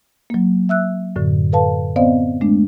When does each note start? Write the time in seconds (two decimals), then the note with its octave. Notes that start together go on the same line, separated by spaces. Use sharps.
0.30 F#3 A#3
0.69 E5 E6 F#6
1.16 F#2 A2 D3
1.52 A4 B4 F5 A5
1.96 B3 C4 C5 D5 D#5 F5
2.41 G#3 A3 D4